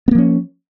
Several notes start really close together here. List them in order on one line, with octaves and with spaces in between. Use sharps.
B3 A#3 F3 C#4